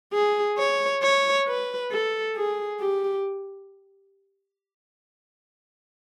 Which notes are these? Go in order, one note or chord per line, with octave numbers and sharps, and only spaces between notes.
G#4
C#5
C#5
B4
A4
G#4
G4